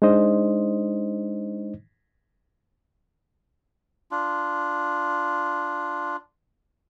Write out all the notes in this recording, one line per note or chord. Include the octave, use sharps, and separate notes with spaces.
G#3 D4 D#4 C5 D#5
D4 F4